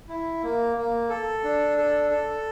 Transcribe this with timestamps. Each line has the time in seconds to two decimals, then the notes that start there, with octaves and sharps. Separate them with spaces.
0.09 E4
0.43 A#3
0.77 A#3
1.09 A4
1.44 D4
1.78 A4
2.11 A4